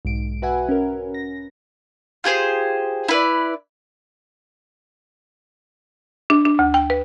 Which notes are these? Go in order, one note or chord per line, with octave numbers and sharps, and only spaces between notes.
B1 G#2 D7
F#4 B4 E5 F#5 G#5
C#4 A#4
A#6
F4 G4 G#4 C5
E4 B4 D5
D4
D4
D2
G5
B4